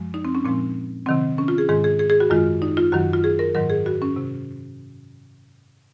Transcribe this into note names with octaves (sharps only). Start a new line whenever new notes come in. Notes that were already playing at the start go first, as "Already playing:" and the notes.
Already playing: F#2 F3 G#3
D#4
C4
C#4
A#2 F3 G#3 C4
C3 D#3 F#3 C4
C#4
F4
G#4
G#2 D#3 G#3 G#4
G#4
G#4
G#4
F#4
F#2 D#3 G#3 F4
D#4
F4
F#2 D#3 F#3 F#4
F4
G#4
A#4
G#2 D#3 F#3 A#4
G#4
F#4
C#4
C3